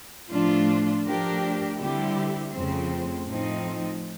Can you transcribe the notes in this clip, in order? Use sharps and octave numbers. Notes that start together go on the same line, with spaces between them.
A2 F3 A3 D4 F4
F3 A3 D4 G4 A#4
D3 G3 C4 E4 G4
F2 C#3 F3 A3 C4
A2 F3 A3 C4 D#4